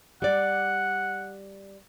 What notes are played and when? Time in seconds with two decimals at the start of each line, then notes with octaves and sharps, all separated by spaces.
0.22 G3 D5 F#5